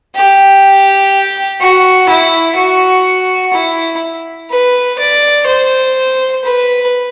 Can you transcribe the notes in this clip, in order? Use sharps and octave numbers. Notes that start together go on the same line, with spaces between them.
G4
F#4
E4
F#4
E4
B4
D5
C5
B4